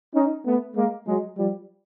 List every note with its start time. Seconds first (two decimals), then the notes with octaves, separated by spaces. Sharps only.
0.15 C#4 D#4
0.45 A3 B3
0.75 G#3 A#3
1.06 F#3 G#3
1.36 F3 G3